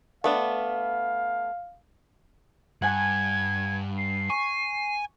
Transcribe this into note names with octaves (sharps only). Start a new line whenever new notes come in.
A3 B3 D4 F5
G2 F#5 G#5 G#6
C7
G#5 C#6